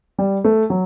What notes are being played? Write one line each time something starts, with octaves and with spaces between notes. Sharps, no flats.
G3
A3
F#3